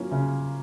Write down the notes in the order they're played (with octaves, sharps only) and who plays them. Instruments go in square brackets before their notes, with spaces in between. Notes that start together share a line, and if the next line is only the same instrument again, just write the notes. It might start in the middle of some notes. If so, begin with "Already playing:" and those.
Already playing: [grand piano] F#3 A#3 C#4 [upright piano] F4
[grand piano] C#3